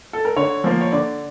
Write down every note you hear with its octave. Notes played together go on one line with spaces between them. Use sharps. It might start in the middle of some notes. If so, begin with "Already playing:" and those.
A4
A#4
D3 C#5
F3 A#3
C#5
D3 D5